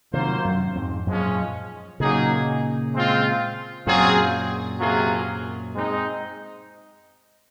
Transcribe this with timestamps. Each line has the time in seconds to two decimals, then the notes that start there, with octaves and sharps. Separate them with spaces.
0.13 C3 D#3 F#3 A#3 F4 C5
0.45 F#2
0.75 F2 G#2
1.07 F#2 A#2 F3 G#3 C#4
2.00 A#2 C#3 F#3 A#3 D#4 G#4
2.94 G#3 C4 F4
3.87 F#2 A#2 F#3 C4 F4 G#4
4.80 C3 F#3 A#3 F4 G#4
5.74 G#3 C4 D#4